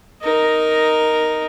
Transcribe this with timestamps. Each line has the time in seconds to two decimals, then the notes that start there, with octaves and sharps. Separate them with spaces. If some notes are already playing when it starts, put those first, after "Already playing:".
0.22 D#4 A#4